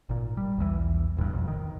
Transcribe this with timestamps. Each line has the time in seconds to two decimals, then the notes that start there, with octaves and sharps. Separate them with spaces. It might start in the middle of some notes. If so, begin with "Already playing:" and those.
0.09 G#1 A#2
0.37 G3
0.58 B1 E2 D#3 E3
1.17 D#1 A1 E2 G2
1.30 B1 F2
1.48 D#3